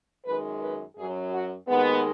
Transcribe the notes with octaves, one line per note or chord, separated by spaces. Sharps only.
F#2 D#3 G#3 B4
B4
F#2 F#3 G#4
F#4
D#2 D#3 G#3 B3